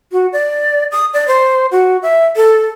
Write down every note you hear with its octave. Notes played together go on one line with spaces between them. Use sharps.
F#4
D5
D#6
D5
C5
F#4
E5
A4